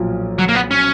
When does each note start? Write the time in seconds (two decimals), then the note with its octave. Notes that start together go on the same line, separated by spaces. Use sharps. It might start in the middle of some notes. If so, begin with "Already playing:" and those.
Already playing: B1 A#2 F3
0.39 F#3
0.48 A#3
0.55 B3
0.71 C#4